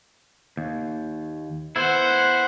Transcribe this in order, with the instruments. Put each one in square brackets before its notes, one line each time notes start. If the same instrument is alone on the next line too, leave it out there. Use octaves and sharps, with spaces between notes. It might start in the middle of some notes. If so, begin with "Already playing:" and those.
[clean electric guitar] D#2
[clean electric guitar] B3 E4 [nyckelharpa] C5 F#5